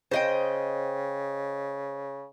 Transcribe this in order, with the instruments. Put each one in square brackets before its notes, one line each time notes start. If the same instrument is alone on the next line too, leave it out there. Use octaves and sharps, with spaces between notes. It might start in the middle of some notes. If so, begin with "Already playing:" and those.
[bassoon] C#3 [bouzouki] C5 D#5 G5